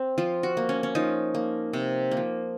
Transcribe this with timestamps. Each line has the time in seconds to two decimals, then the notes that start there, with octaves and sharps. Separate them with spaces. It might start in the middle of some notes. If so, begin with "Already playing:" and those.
Already playing: C4
0.18 F3 F4
0.43 F#4
0.57 A#3
0.69 C#4
0.83 C#4
0.95 F3 D#4
1.35 A#3
1.73 C3
2.11 A#3
2.17 F3